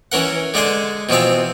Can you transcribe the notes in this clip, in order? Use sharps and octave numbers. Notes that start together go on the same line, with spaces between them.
E3 C#4 A#4 F#5
D3 G#3 D4 G#5 C6
B2 E3 F3 C4 F5